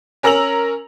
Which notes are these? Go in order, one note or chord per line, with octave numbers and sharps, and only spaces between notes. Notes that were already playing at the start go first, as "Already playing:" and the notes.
C#4 A#4 A#5 E6 F7 F#7